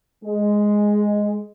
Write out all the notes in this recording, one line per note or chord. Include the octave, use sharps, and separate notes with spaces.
G#3